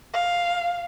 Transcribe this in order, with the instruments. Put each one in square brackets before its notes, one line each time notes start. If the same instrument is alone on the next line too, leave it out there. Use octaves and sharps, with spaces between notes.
[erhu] F5